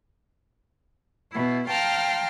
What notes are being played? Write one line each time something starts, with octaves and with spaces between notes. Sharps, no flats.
B2 E4
F5 G5 A5 A#5 C6 F6